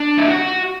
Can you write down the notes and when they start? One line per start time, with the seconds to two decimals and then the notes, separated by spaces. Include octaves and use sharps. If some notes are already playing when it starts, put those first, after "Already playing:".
Already playing: D4
0.17 E4
0.28 F#4